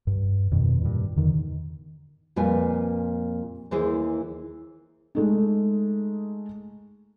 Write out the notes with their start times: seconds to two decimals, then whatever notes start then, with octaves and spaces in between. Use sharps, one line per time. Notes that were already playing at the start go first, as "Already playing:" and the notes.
0.07 G2
0.51 F2 B2 D#3
0.82 G2 A#2
1.16 E2 D3 D#3
2.36 F2 A#2 G3 B4 G#5
3.71 D#2 E3 G#4 C5
5.15 G#3 A3 D#4